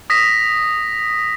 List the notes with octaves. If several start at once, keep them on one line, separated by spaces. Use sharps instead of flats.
D#6 A#6 B6